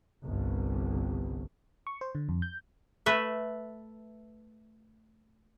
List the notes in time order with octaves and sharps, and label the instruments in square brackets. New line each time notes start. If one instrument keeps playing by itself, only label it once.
[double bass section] G1 C2
[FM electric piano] C#6
C5
D3
F2
G6
[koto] A3 B4 E5